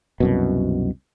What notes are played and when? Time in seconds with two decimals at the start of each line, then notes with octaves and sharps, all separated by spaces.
0.20 C2 F#2 B2